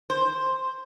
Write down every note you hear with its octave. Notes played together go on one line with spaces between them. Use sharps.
C5